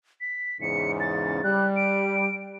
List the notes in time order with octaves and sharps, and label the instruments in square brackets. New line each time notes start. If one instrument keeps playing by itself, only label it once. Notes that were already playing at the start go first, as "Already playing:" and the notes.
[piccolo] B6
[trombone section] E2 G#2 C#3 [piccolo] C#7
[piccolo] A6
[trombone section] G3 [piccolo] F#6
[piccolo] D7